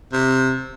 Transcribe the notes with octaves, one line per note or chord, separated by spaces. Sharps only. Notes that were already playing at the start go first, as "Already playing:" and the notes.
C3